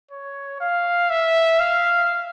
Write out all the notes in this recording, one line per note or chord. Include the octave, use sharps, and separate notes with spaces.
C#5
F5
E5
F5